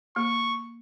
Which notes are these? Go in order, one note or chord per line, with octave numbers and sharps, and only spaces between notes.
A#3 C#6